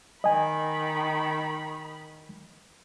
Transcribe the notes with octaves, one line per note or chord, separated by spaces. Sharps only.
D#3 D#5 G#5 B5